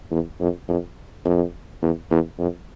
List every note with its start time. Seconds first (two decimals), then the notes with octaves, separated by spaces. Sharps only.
0.11 E2
0.40 F2
0.69 F2
1.25 F2
1.82 E2
2.11 E2
2.38 F2